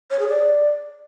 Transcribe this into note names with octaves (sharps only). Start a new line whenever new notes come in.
C#5
G#4
D5